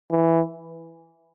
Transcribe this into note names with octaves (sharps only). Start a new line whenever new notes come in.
E3